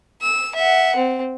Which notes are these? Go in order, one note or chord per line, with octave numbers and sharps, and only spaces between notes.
E6
E5 F#5
C4